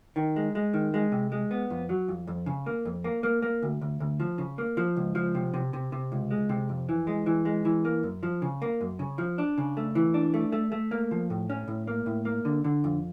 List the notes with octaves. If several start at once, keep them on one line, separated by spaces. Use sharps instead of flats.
D#3
G#3
G#3
D#3
G#3
C3
G#3
B3
F2
F#3
F2
F2
C#3
A#3
F2
A#3
A#3
A#3
D2
D2
D2
F3
C#3
A#3
F3
C#2
F3
C3
C3
C3
C3
C#2
G#3
C3
F2
E3
G#3
E3
G#3
E3
A#3
F#2
F3
C#3
A#3
F#2
C#3
F3
D4
C#3
A3
E3
D4
A3
A3
A3
A#3
F3
A2
C#4
A2
A#3
A2
A#3
D3
D3
F2